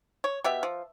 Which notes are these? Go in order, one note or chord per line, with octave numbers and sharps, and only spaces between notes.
C#5
B2 G4 E5
F3